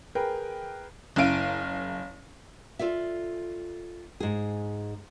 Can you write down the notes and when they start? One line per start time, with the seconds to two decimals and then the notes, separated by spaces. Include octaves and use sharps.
0.15 G#4 A#4 B4 G5
1.16 F#1 C#3 E4 F5 D7 D#7
2.79 F4 A4 D5 E5
4.20 G#2 G#4